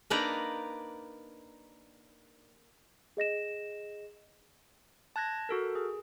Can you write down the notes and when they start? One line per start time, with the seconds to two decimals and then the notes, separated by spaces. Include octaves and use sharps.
0.10 A#3 D4 D#4 B4 D5 A#5
3.17 G#4 D#5 A#6 E7
5.16 A5 F#6 G#6 A#6
5.49 F#4 A4 A#4
5.75 G#4